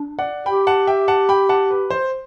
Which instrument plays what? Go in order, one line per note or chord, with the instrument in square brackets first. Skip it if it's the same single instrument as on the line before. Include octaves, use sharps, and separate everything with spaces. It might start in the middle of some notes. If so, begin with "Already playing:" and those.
Already playing: [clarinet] D4
[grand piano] D5 F#5
[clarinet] G4 [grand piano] G5 B5
[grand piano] F#5 A5
E5 G5
F#5 A5
G5 B5
F#5 A5
B4
C5